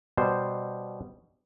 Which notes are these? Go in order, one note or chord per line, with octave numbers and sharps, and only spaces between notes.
B2 G3 C5